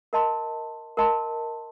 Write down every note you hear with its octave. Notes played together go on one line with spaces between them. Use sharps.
A#4 D#5 A5 C6
A#4 D#5 A5 C6